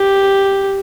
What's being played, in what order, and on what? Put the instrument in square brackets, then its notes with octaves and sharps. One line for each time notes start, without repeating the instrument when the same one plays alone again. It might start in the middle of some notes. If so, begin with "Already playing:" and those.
Already playing: [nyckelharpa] G4